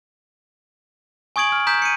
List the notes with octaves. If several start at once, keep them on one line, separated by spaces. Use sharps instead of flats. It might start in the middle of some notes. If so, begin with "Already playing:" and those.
G#5 C#6 D#6 G#6 D7 F#7
F6
A#5 D#6 G6 B6
C#7 D#7